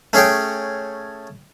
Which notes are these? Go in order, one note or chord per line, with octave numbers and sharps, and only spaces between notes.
A3 C#4 G#4 C#5 G5